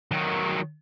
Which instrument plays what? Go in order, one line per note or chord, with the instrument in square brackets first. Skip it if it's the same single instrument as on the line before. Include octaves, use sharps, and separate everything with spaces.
[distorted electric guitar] D#3 F#3